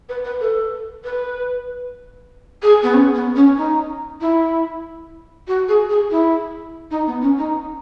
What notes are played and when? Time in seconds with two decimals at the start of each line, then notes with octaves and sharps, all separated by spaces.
0.09 B4
0.25 B4
0.41 A4
1.04 B4
2.63 G#4
2.83 B3
2.94 C#4
3.15 B3
3.36 C#4
3.58 D#4
4.21 E4
5.48 F#4
5.69 G#4
5.90 G#4
6.11 E4
6.91 D#4
7.07 B3
7.22 C#4
7.38 D#4